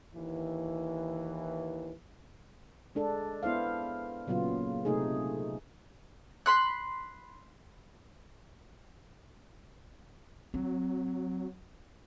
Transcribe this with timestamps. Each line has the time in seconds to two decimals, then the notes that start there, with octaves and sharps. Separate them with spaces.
0.15 D#2 E3
2.95 G#3 D4 A4
3.43 B3 E4 C5 F5
4.27 A#2 C#3 F#3 B3 F4
4.85 C3 A3 D#4 G#4
6.46 B5 C6 F#6
10.54 F#3 C4